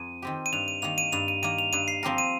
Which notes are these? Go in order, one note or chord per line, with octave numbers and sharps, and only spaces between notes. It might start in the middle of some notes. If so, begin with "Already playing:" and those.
Already playing: F2 D#7
D#3 C4 G4
D#7
G2 F7
D#7
D#3 A#3 F7
D#7
G2 F7
D#7
D#3 A#3 D#7
F7
G2 D#7
C7
F3 C4 G4 A#4
D#7